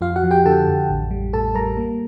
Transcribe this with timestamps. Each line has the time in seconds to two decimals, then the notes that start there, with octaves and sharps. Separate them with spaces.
0.01 F2 F4 F5
0.16 F#4 F#5
0.24 F3
0.31 G4 G5
0.46 D3 A4 A5
0.68 F2
0.89 A1
1.11 G3
1.33 A2 A4 A5
1.55 G3 A#4 A#5
1.77 A#3